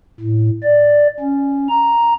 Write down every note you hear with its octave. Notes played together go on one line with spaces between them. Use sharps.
A2
D5
C#4
A#5